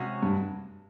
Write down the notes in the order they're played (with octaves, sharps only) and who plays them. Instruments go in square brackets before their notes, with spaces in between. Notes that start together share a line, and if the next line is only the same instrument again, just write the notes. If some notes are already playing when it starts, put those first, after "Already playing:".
Already playing: [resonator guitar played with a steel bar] C3 G#3 C#4 F#4
[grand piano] G2